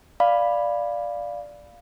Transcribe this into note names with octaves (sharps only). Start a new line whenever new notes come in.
D5 F5 B5